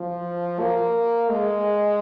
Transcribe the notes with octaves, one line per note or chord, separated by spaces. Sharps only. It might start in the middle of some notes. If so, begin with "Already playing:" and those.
Already playing: F3
A#3
G#3